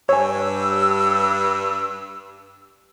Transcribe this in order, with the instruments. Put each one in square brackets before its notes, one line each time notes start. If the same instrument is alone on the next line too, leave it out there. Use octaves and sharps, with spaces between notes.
[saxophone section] G2 [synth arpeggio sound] C#5 G#5 [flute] E6